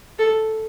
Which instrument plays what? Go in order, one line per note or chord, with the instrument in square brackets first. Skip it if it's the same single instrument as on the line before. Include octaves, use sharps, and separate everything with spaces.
[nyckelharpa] A4